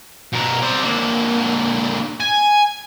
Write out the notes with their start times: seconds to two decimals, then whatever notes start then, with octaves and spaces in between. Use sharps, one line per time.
0.33 B2 A#4
0.62 C4 D5
0.84 D3 A#3
2.20 G#5